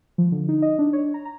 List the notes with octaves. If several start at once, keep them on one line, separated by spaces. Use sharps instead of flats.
F3
D3
D#4
D#5
D4
C#5
A#5
A#5